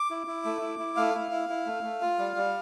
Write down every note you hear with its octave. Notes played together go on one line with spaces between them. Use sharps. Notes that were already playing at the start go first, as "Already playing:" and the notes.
Already playing: D6
E4
E4
A3
E4
E4
A3 F5
E4
E4
E4
A3
A3
F4
G3
G3